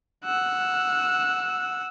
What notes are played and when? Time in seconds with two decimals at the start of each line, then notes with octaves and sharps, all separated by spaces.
0.24 F#5 E6